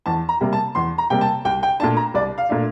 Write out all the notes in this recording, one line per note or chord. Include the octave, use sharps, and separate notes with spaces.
E2 A5
A#5
C3 G3 A#3
A5
E2 C6
A#5
C3 G3 A#3 G5
A5
C2 G5
G5
A#2 A3 D4 A5
A#5
C2 D5
F5
A#2 A3 D4